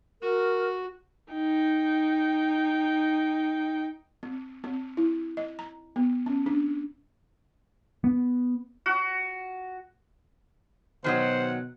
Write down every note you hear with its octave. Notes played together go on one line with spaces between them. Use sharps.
F#4 A#4
D#4 G5
C4
C4
E4
D#5
A#5
B3
C#4
D4
B3
F#4
B2 D#3 F#3 C5 D#5 F#5